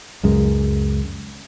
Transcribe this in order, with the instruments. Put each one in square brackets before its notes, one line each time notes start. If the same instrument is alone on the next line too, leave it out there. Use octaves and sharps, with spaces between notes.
[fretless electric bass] C#2 F#2 G#3